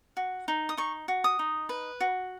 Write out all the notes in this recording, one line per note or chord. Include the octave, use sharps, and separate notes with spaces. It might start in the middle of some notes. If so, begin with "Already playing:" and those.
F#4
D#4
D#6
D#4 C#6
F#4
D#6
D#4
B4
F#4